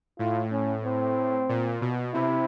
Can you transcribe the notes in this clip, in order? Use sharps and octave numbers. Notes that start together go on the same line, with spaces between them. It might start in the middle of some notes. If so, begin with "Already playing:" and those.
A2 F4
C#4
C4
A#2
B2
C3 E4